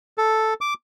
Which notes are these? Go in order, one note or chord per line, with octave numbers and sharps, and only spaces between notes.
A4
D6